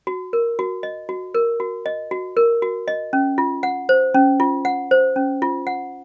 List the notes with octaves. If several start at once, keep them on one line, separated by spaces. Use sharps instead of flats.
F#4
A#4
F#4
D#5
F#4
A#4
F#4
D#5
F#4
A#4
F#4
D#5
C#4
F4
F#5
C5
C#4
F4
F#5
C5
C#4
F4
F#5